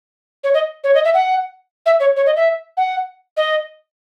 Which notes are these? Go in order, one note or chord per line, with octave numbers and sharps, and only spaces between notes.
C#5
D#5
C#5
D#5
E5
F#5
E5
C#5
C#5
D#5
E5
F#5
D#5